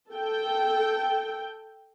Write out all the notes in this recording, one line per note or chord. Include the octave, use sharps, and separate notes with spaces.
A4 G5